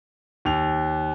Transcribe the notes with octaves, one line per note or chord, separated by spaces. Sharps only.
D#2 F7